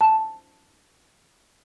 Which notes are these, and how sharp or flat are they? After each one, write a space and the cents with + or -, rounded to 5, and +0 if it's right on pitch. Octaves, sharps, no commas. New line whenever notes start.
A5 +0